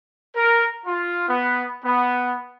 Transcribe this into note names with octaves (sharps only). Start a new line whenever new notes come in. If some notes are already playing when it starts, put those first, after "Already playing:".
A#4
F4
B3
B3